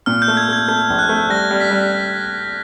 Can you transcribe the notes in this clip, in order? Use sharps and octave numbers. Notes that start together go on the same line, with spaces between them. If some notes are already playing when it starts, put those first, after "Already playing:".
A#2 F6
G6
A3
G#6
A3 G#6
A3 G6
A#1
F#6
A3
G3 A#6
G3
B6
G3